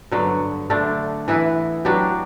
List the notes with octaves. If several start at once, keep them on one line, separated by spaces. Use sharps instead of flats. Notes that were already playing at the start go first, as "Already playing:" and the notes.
G2 D3 F#3 B3
D3 A3 D4
E3 B3 E4 B4
F#3 B3 D4 G4